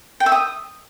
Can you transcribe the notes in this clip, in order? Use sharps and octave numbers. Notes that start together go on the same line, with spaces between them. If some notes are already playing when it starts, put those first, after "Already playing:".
G5
E5
D#6